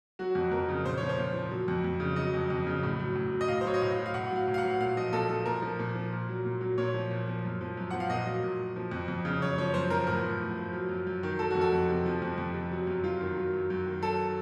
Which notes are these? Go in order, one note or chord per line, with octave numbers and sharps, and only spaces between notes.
F#3 F#4
F2
F2 A#4
C#3
A#2 C5
F3 C#5
C5
A#2
F3
F#3
F2
F2
C#3
F#3 D#5
F2
F2
C#3
A2
F#3
A2
F#3
D#5
A2 F5
C5
F#3 C#5
D#5
A2 F5
F#3
F5
A2 F#5
F#3 F5
A2
F5
F#5
F#3
A#2 F5
F3 D#5
A#2 A4
F3 A4
A#2 A#4
F3
A#2
F3
A#2
F#3
A#2
F#3
A#2 C#5
F3
A#2
F3
F#2
F3
F#2
F3 F#5
F5
A#2 D#5
F#3
A#2
F#3
F3
F2
F2
C#3
F#2 C#5
F3 C#5
F#2 C5
F3 A#4
A2 A#4
F3
A2
F3
F#3
F#2
F#2
D#3
F#3 A4
F2 F#4
A4
F2
C3
F3
F2
F2
C3
F#3
F#2
F#2 F4
D#3
F#3
F#2
F#2
D#3
F#3 A4